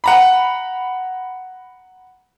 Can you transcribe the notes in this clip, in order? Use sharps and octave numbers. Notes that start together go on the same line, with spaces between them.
F#5 A#5 B5